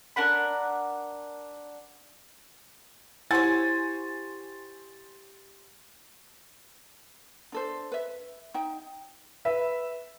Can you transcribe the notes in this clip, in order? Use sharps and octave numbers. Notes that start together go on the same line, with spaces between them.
D4 A#4 F#5 B5
E4 G4 C5 C#5 F#5 G#5 A6
D4 A4 C5
B4 E5
D#4 G5
B4 E5